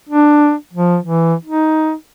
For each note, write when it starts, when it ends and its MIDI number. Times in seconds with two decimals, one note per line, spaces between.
0.09 0.54 62
0.73 0.98 53
1.03 1.34 52
1.45 1.93 63